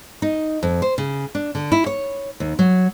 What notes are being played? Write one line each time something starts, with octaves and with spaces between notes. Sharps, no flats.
D#4
F2
C5
C#3
D4
D3
E4
C#5
D#2
F#3